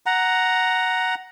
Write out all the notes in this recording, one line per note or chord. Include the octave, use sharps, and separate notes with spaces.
F#5 A#5